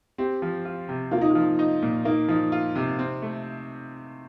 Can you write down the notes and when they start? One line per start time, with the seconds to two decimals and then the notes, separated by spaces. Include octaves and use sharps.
0.18 C4 G4
0.42 F3
0.65 F4
0.89 C3
1.11 A#3 F4
1.21 D#4
1.30 F4
1.35 F3
1.59 D#4
1.82 A#2
2.05 A#3 D#4
2.28 F3 D#4
2.52 F4
2.76 C3
2.99 C4
3.22 A3